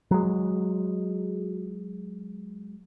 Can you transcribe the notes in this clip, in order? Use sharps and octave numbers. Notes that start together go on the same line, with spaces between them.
F#3 G#3